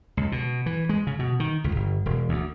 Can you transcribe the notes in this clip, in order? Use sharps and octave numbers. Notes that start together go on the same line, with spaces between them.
C#2
B2
E3
G#3
C#3
B2
D#3
C#2
G1
E1
D2